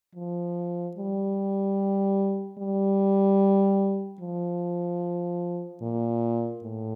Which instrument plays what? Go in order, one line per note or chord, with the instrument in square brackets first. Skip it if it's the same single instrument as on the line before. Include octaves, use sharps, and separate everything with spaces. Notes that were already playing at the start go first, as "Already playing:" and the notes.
[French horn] F3
G3
G3
F3
A#2
A2